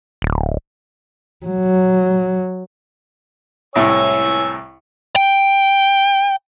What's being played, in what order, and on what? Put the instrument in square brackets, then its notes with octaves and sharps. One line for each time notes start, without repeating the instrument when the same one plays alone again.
[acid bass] D1
[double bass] F#3
[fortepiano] C2 A2 [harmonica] C#5 G#5 E6
[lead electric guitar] G5